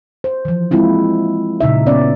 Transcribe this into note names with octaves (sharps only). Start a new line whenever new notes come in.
C5
E3 F3
G#3 A#3 C4 E4 F4
A#2 C#3 D#4 E5
B3 C#4 D5